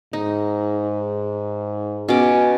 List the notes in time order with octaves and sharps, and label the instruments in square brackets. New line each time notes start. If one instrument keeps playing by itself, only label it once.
[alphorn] G#2 [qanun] D#4
[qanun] B2 D6 [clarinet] C#4